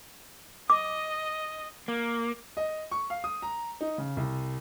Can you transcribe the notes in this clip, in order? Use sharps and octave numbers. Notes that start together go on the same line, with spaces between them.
D#5 D6
A#3
D#5
C#6
F5
D#6
A#5
D#4
C#3
C2